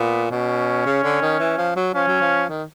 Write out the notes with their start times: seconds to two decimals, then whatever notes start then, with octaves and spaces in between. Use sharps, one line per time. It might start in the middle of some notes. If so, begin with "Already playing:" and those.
Already playing: A#2 B3
0.30 B2 C#4
0.86 C#3
1.04 D3
1.22 D#3
1.40 E3
1.58 F3
1.76 F#3
1.94 F3 C#4
2.08 F#3
2.21 F3
2.49 D#3